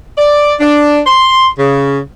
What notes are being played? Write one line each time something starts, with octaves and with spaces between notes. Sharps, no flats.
D5
D4
C6
C#3